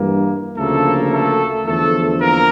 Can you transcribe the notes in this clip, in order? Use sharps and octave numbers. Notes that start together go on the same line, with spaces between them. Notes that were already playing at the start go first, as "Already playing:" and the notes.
Already playing: G2 E3 A#3
D2 C#3 F3 A3 A#3 A4
A3 A4
E2 D3 F3 A3 A4
A#3 A#4